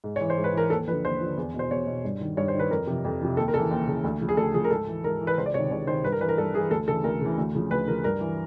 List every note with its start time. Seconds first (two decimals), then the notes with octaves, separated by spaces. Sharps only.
0.04 G#2
0.16 E3 C#5
0.30 C5
0.38 G#2
0.44 B4
0.53 E3 A#4
0.70 D#2 A4
0.88 D3 F3 B4
1.05 D#2 C5
1.20 D3 F3
1.38 E2
1.54 B2 C5
1.71 E2 C#5
1.87 B2
2.05 G2
2.21 D#3
2.37 G2 C#5
2.48 C5
2.54 D#3
2.59 B4
2.70 F2 A#4
2.87 C3 F3
3.05 F2
3.21 C3 F3
3.37 D#2 A4
3.48 A#4
3.54 C#3 E3 A4
3.71 D#2
3.87 C#3 E3
4.04 D2
4.21 C#3 F3
4.29 G#4
4.37 D2 A4
4.54 C#3 F3 G#4
4.64 A#4
4.71 G#2 A4
4.87 E3
5.04 G#2 A#4
5.20 E3
5.27 B4
5.38 C#2 C5
5.46 D5
5.54 C3 D#3 C#5
5.71 C#2 C#5
5.87 C3 D#3 C5
6.04 G2 B4
6.12 A#4
6.20 E3 B4
6.29 A#4
6.37 G2 A4
6.54 E3 G#4
6.71 D2 A4
6.87 C#3 E3 A4
7.04 D2 A#4
7.21 C#3 E3
7.38 D2
7.55 C#3 F3
7.71 D2 B4
7.88 C#3 F3 A#4
8.04 G2 A#4
8.20 E3